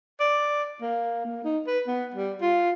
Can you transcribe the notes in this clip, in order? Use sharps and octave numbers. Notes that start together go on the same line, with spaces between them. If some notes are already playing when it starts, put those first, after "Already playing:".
D5
A#3
A#3
D#4
B4
B3
G3
F4